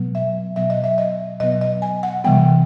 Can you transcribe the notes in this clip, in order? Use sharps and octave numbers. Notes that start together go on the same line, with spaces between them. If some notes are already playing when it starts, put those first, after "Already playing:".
Already playing: B2 F#3 B3
E5
B2 F#3 B3 E5
D#5
E5
D#5
B2 F#3 B3 D#5
D#5
G#5
F#5
C3 E3 G3 B3 G5